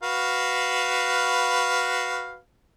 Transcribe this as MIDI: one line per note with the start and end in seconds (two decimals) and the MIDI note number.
0.03 2.39 66
0.03 2.39 71
0.03 2.39 77